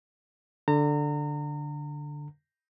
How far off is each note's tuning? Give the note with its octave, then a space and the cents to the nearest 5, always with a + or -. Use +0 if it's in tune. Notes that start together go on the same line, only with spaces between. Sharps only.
D3 +0 A#5 -35